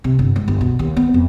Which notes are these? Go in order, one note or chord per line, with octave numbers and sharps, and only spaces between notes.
C3
G1
G#2
G1
B2
D#2
B3
F2